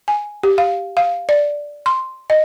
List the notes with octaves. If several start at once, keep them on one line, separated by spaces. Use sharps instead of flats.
G#5
G4
F5
F5
D5
C6
D#5